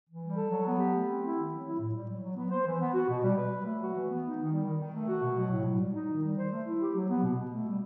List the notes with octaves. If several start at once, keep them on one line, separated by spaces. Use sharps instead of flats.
E3
G3
A4
F#3
B3
G4
A3
C4
E4
D#3
F#3
E4
A2
G3
F#3
F#3
B3
C5
E3
B3
F#4
B2
G3
B4
F#3
A3
F#4
E3
B3
D#4
D#3
G3
D#3
D#3
A3
F#4
B2
F#3
A2
A2
G3
D#4
D#3
G3
C5
A3
E4
G4
F#3
B3
B2
B2
A3
G3